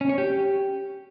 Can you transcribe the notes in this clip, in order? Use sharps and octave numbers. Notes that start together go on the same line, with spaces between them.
C#4
C#5
G4